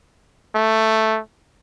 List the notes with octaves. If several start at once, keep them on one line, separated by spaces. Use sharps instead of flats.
A3